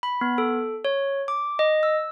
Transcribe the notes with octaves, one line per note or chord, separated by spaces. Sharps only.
B5
B3
A4
C#5
D6
D#5
E6